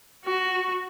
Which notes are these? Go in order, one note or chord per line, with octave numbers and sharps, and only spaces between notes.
F#4